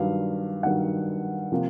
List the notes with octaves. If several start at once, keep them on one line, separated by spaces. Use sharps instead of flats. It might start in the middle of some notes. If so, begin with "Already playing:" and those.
Already playing: G2 D#3 F#3 F5
G2 D#3 F#3 F#5
C3 F3 A#3